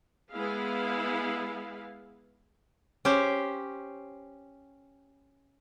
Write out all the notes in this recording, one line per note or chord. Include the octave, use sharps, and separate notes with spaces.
G#3 B3 E4 G#4 F5
C#4 G4 C5